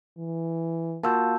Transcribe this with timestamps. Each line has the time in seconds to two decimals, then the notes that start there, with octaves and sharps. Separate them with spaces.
0.18 E3
1.03 A#3 F4 F#4 A5 E6 G6